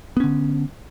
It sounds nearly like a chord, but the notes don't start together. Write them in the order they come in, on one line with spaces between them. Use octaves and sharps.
B3 C#4 D3